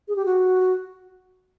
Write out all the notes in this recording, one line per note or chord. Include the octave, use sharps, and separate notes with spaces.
G#4
G4
F#4